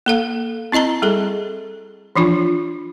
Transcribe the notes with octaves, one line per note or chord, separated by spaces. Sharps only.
A#3 A4 F5
C4 E4 D#5 A5 A#5
G3 G#4 A4
E3 F3 D4 F4